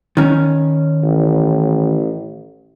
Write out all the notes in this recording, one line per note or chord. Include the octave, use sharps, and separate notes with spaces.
D#3 C#4
A1